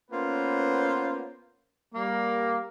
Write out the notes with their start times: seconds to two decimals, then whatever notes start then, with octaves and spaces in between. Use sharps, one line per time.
0.11 A#3 B3 C#4 F4 B4 C5
1.95 G3 A#3